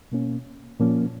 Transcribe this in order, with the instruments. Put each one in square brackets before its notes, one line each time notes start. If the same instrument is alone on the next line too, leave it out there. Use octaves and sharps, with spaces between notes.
[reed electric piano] B2 A#3 C#4
A#2 F3 A#3 C#4